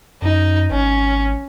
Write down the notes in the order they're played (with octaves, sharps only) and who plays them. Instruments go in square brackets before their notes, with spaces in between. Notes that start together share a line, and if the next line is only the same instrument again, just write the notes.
[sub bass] F#2 [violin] D#4
[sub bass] G#1 [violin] C#4